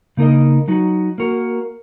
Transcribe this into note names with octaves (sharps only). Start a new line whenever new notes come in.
C#3 A#3 D#4 A#4 D#5
F#3 D#4 F#4
A#3 F#4 A#4